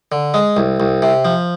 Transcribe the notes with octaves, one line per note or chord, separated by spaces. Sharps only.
D3
G#3
C2
C2
C3
F3